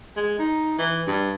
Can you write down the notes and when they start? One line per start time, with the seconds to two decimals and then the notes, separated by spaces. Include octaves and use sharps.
0.16 G#3
0.39 D#4
0.79 E3
1.07 G2